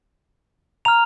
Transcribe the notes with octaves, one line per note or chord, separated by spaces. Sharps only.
A#5 F6 F7